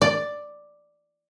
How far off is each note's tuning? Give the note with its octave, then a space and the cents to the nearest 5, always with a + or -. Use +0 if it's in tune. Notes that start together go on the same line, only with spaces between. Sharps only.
D5 +5